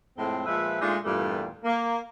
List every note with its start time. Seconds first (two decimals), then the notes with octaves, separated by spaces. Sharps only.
0.17 F2 A2 G#3 C4
0.46 A#2 F3 G#3 B4 E5
0.80 A#2 G#3 A3 D4 D#4 F4
1.04 E2 G2 A#2 G3 A3 F4
1.64 A#3